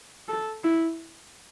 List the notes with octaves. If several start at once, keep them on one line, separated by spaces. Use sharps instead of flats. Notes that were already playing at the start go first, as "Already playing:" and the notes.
A4
E4